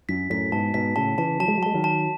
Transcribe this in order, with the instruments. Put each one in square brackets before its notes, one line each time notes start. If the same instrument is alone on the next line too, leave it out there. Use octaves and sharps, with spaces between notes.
[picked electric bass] F#2 [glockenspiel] B6
[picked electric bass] F#2 A2 [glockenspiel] B6
[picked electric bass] G#2 B2 [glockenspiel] A5
[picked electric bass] G#2 B2 [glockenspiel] B6
[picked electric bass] A2 C#3 [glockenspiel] A5
[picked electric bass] C#3 E3 [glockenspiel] A5
[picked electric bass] F#3 [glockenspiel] A5
[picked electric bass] G#3
F#3
[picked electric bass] G#3 [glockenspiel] A5
[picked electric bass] D#3 F#3
[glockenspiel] A5